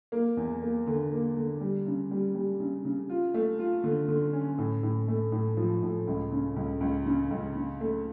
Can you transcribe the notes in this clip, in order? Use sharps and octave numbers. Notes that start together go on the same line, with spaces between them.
A#3
E2
A#3
D3
A#3
D3
G3
C#3
G3
G3
C#3
C#3
F4
A3
F4
D3
D3
C#4
A2
A2
A3
A2
F3
A2
C#2
C#3
C#2
C#2
C#3
C#2
C#3
A3